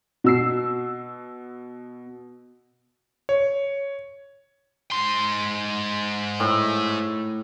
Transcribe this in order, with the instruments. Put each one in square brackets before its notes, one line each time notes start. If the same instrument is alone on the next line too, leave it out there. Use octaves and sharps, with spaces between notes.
[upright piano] B2 E6 C7
[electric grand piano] C#5
[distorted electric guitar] G#2 C6
[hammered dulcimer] A2